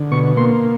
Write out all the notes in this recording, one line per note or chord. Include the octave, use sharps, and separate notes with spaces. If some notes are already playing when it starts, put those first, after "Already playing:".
Already playing: D3
B2 C#6
A#3 C6